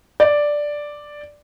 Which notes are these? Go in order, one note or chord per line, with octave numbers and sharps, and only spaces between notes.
D5